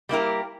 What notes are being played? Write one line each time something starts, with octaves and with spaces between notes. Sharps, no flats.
G3 A#3 E4 G4 A#4